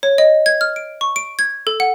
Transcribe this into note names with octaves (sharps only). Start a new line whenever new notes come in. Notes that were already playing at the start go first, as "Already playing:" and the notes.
C#5
D#5
G#6
F6
D7
C#6
D7
G#6
A4
F#5